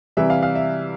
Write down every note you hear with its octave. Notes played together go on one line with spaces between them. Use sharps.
C3 E3 G3 E5
F5
F5
E5